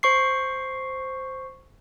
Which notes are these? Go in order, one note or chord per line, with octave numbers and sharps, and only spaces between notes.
C5 C#6 C7